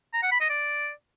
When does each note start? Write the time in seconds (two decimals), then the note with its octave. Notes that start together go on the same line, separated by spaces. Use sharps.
0.14 A#5
0.23 F#5
0.32 B5
0.41 D#5
0.50 D5